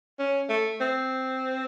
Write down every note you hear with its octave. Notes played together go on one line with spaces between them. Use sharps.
C#4
A3
C4